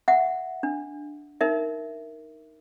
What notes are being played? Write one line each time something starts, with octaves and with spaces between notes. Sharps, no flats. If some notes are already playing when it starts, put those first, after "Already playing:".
E5 F#5
D4
D#4 A#4 E5